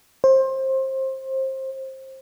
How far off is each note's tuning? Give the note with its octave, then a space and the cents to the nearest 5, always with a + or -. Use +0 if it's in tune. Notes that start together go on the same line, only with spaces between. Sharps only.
C5 +25